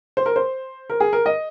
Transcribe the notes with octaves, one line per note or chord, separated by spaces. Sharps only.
C5
A#4
C5
A#4
G#4
A#4
D#5